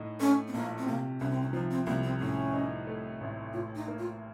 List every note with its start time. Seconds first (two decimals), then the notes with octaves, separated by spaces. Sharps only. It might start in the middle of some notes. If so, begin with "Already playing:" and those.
Already playing: A2 D#4
0.20 A3 C#4
0.48 C4
0.53 A#1 A#3
0.78 C4
0.86 C3 A#3
1.20 C2 C#4
1.30 C4
1.41 C#4
1.53 F3 D#4
1.71 C4
1.86 C2 A#3
2.03 C4
2.20 A2 C#4
2.53 D#4
2.87 A3
3.21 A1
3.53 A2 F4
3.75 D#4
3.88 A#3
3.98 F4